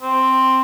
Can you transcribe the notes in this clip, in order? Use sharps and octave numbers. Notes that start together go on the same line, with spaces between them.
C4